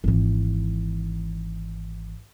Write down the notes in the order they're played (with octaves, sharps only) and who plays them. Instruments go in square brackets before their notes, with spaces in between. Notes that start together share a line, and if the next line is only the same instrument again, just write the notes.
[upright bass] G#1 E3